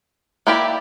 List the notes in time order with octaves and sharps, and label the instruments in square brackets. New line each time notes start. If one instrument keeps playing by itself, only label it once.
[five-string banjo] A#3 E4 G4 D5